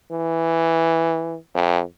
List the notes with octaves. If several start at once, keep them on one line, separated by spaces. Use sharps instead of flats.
E3
F2